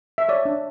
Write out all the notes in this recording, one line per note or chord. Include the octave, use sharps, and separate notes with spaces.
E5
C#5 D5
D4